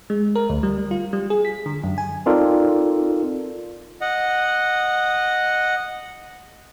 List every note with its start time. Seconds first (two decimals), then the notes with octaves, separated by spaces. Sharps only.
0.10 G#3
0.35 A#4
0.49 D2
0.63 G3
0.91 F4
1.13 G3
1.30 G#4
1.45 B6
1.66 D3
1.84 F#2
1.98 G#5
2.26 C4 D#4 F4 A4 A#4 D5
4.01 D#5 F#5